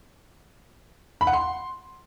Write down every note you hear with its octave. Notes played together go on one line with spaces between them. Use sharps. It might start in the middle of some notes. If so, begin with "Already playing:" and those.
B5
F#5
C6